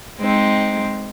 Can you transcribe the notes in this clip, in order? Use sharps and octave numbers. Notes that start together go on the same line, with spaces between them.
G#3 C4 D#4